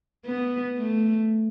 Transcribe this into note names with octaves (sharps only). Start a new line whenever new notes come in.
B3
A3